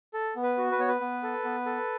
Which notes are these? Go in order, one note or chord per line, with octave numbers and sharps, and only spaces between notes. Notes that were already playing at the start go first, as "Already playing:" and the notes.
A4
B3
B4
F#4
B4
B3 C#5
B4
B3
A4
B3
A4